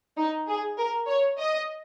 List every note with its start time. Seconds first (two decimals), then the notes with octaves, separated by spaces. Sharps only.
0.17 D#4
0.48 G#4
0.78 A#4
1.07 C#5
1.38 D#5